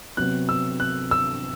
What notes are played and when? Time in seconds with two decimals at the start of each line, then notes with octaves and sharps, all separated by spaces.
0.17 C3 F#3 B3 F#6
0.49 E6
0.80 F#6
1.11 E6